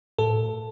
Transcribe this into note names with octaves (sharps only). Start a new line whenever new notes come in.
A2 A4